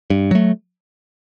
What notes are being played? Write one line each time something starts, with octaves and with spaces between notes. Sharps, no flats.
G2
F#3 A3